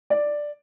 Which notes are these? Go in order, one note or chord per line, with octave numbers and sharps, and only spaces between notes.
D5